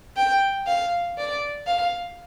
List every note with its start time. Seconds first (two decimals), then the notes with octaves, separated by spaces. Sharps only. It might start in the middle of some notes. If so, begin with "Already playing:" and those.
0.17 G5
0.66 F5
1.18 D5
1.67 F5